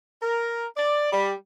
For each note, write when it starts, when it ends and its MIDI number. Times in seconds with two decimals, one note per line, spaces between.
0.23 0.66 70
0.77 1.12 74
1.13 1.32 55